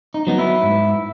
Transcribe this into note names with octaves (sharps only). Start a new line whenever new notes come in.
D#4
F#3 B3 D#4
E4
G#2